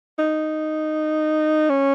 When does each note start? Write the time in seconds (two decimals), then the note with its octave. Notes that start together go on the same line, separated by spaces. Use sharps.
0.19 D#4
1.70 C#4